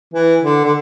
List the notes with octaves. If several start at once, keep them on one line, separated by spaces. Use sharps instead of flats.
E3
D3
D3